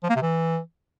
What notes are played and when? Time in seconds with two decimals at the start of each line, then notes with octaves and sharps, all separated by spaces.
0.03 F3
0.09 A#3
0.16 C3
0.22 E3